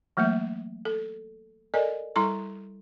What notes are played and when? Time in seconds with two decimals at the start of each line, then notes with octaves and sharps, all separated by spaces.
0.17 E3 F#3 A3 A#3 E5
0.85 A4
1.74 A4 A#4 D5 D#5 G#5
2.16 G3 E4 A4 A#5 C6 C#6